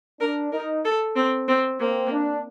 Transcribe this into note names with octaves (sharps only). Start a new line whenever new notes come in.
D4 A#4
D#4 A#4
A4
C4
C4
A#3 C4
D4